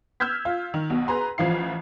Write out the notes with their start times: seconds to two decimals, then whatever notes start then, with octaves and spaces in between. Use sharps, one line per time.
0.20 E6 F6 G6 G#6 B6
0.45 F4
0.74 D#3
0.90 B1 B2
1.08 G#4 B4 A#5 C6
1.38 A1 E3 F3 F4 C7